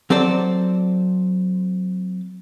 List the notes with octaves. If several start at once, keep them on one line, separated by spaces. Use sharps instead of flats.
F#3 C4 G4 A4 C5 D5